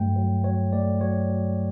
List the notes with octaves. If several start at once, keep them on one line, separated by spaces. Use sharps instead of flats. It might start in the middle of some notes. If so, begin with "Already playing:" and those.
Already playing: G2 F#3 A3 G5
F#3
F#3 C#5
A3 D5
F#3 C#5
F#3